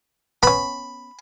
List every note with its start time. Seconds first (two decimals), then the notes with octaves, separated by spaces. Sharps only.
0.43 B3 C#4 B5